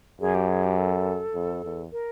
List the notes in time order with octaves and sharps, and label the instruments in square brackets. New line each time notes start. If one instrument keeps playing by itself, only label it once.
[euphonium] F#2 [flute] G#4
[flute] G4
G#4
G4
A4
[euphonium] F2
E2
[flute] A#4